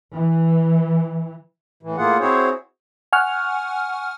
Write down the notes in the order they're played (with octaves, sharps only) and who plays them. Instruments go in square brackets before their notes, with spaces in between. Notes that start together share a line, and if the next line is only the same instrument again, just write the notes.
[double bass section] E3
[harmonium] A2 E3
A2 A#3 F4 G#4 F#5
C4 E4 F#4 G#4 C5 C#5
[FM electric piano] F#5 G#5 C#6 F6